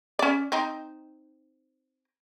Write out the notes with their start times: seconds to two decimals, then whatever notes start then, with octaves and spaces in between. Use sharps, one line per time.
0.19 C#4 D5
0.52 C4 D#4